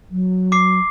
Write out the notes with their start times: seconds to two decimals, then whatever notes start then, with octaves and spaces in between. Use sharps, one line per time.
0.11 F#3
0.52 D6 C7